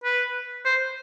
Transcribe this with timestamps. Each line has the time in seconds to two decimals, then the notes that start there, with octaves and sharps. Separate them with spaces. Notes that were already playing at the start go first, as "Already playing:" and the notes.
0.04 B4
0.65 C5